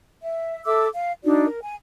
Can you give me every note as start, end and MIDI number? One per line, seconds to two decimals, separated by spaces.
0.23 0.64 76
0.65 0.87 69
0.65 0.87 76
0.65 0.87 86
0.65 0.87 88
0.93 1.11 77
1.23 1.45 62
1.23 1.45 63
1.23 1.45 66
1.23 1.45 74
1.46 1.59 70
1.62 1.74 80